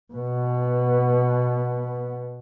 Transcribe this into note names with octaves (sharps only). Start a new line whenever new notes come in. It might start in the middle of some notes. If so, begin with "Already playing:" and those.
B2 B3